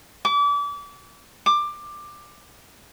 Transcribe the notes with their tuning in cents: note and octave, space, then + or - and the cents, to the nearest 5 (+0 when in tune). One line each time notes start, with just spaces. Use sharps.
D6 -35
D6 +15